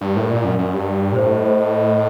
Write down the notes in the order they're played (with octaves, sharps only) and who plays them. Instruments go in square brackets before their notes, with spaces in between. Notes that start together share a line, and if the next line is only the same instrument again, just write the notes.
[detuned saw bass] G2 [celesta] G4
[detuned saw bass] A2 [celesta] A#4
[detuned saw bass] A#2 [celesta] D5
[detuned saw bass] F#2 [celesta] A#4
[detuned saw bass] F#2 [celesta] A#4
[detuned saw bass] G2 [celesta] G4
[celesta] G5
G4
[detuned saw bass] A#2
[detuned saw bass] A2 [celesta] C5
[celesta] D#5
C5
D#5
D#5
D#5